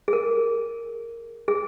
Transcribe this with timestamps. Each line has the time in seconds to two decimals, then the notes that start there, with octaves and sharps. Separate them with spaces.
0.08 G#4
0.13 A#4
1.48 G#4